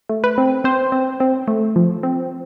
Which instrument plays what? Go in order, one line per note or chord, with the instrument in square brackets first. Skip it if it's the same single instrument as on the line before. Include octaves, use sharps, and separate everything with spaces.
[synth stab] A3
B4
C4
C4 C5
C4
C4
A3
F3
C4